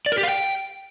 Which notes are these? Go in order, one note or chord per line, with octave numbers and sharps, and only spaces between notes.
D5
A#4
G4
F5
G5